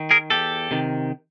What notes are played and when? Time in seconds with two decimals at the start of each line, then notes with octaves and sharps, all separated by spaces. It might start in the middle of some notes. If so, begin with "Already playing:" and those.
Already playing: D#3
0.11 G#4 A#4
0.30 E2 G4 A4
0.71 C3 D#3